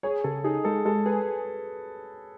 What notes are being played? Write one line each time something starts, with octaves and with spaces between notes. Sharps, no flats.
G#4 C#5
C#3 A4
D#4 G#4
G#3 A4
G#3 A4
G#4 B4